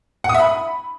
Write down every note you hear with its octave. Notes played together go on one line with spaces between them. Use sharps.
F#5
D#6
E5
B5